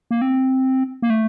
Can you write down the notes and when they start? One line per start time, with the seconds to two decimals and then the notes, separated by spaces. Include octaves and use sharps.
0.11 A#3
0.22 C4
1.02 A#3
1.10 A3